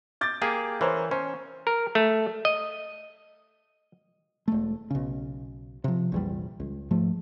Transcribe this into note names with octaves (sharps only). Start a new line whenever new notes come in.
D6 G6 A6
A#3 G4 G#4
E3 A#4 C5 C#5
C#4 C5
A#4
A3
D#5
E1 A3
B1 C#3
C3 F3
A#1 E2 G3
C#2
G#2 F3 A3